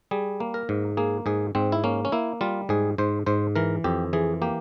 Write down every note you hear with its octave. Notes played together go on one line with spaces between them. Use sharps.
G3 G#4
A#3
A#4
G#2
A#3 G#4
G#2 G#4
G#2 C4
E4
A#3 C#4
C#4
A#3 E4
G3 F4
G#2 G#4
G#2 C5
G#2 C5
E3 A#4
F2 G4
E3 G#4
A#3 G4